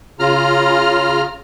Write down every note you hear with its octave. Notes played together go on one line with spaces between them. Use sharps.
C#3 F4 A#5 F6